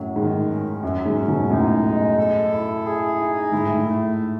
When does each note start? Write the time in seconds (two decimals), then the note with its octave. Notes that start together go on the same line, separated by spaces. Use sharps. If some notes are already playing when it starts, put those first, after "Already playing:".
Already playing: F#2 A2 F#3
0.16 G#2 D#3
0.50 C#4
0.83 F#2 F#3
1.05 G#2
1.17 C#4
1.28 G#2 B2
1.50 F#2 A2 D#4
1.84 G#3
2.18 A4
2.52 E4
2.86 G#4
3.19 D#4
3.52 G#2 E4
3.65 A2
3.78 G#2
3.87 A3